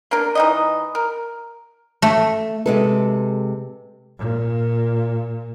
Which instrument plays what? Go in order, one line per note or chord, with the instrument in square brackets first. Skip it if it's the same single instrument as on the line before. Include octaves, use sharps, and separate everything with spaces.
[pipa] A#3 D4 A#4
E3 D#4 D#5
A#4
[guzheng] A3
[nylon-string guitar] C3 G#3 A4 [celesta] B4
[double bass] A#2